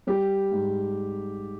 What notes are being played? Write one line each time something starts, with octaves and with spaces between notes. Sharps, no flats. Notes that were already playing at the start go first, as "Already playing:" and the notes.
G3 G4
G#2